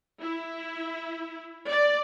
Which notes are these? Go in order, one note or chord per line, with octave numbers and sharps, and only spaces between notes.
E4
D5